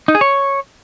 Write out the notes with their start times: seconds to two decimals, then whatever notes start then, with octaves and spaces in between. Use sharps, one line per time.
0.08 D#4
0.15 G#4
0.21 C#5